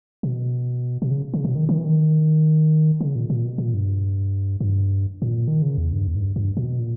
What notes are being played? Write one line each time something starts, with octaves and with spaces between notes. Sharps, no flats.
B2
B2
C#3
C#3
B2
D#3
D#3
E3
D#3
C#3
A#2
A#2
B2
A#2
G2
G2
G#2
A#2
D#3
C#3
E2
G2
E2
G#2
G2
G2
A#2
B2
A#2